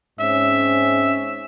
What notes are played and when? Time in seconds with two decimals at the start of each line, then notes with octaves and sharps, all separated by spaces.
0.20 G#2 C4 C#4 E5